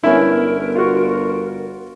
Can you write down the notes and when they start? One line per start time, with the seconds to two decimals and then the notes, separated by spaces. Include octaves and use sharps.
0.04 G1 B3 C#4 E4 A#4
0.75 F4 F#4